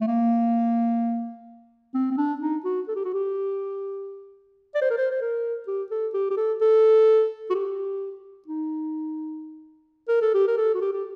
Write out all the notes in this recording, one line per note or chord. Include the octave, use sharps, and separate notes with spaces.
A3
A#3
C4
C4
D4
D#4
F#4
A4
G4
F#4
G4
D5
C5
A#4
C5
C5
A#4
G4
A4
G4
G4
A4
A4
F#4
G4
D#4
A#4
A4
G4
A#4
A4
F#4
G4
G4